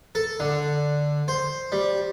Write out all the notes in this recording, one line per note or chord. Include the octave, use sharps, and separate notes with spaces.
A4
D3
C5
G3